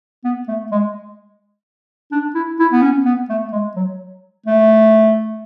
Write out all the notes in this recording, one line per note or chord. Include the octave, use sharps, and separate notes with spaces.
B3
A3
G#3
D4
E4
E4
B3
C#4
B3
A3
G#3
F#3
A3